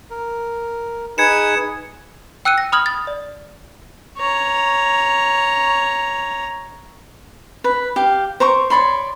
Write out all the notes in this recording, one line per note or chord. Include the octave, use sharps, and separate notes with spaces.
A#4
D#4 G#4 B4 G#6 C#7 E7
G5 E6 F#6 C#7 D#7
A#6
B5 D#6 F6 G#6 F#7
A6
D5
C#5 A#5
B4
G4 F5
C5 A#5 C#6 D6
C#5 D5 B5 C6